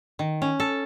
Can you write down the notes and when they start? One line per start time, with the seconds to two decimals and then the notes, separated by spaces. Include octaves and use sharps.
0.19 D#3
0.42 C#4
0.60 A4